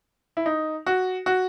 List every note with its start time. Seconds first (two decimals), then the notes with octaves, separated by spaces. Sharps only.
0.37 E4
0.46 D#4
0.86 F#4
1.26 F#4